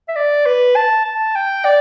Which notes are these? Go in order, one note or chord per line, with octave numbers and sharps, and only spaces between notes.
E5
D5
B4
A5
A5
G5
D5